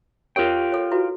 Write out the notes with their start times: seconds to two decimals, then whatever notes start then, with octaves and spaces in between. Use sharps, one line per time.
0.36 F4 G4 A#4 C#5 G5
0.72 A4 C#5
0.91 E4 F#4 B4